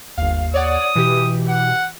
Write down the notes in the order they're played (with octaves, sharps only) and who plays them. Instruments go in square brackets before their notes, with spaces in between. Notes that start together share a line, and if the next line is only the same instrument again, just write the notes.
[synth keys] G1 F5 [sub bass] D#2
[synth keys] C#5 D5 F#5 [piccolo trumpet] D#6
[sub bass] B2 [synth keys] E3 G4
[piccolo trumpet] F#5